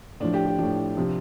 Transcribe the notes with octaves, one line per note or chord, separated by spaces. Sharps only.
A2 F3 D4
G4
G4
A2 F3 D4
C3 F3